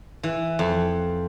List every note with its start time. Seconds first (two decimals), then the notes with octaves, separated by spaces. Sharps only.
0.23 E3
0.59 F2